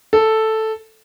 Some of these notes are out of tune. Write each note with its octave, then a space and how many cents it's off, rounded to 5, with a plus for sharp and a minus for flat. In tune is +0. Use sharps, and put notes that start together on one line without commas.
A4 +0